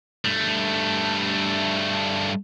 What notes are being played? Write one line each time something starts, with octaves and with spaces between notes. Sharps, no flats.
G2 A3